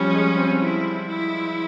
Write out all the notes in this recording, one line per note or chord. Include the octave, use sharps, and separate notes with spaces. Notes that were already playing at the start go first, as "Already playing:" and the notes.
Already playing: F3 G3 C#4
G#3
C4
E4
E4